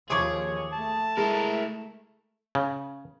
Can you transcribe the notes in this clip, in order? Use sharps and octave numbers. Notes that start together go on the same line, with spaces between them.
D#2 F3 G#4 C#5 C#6 D6 G#6
A3 A5
G#3 E4 A#4
C#3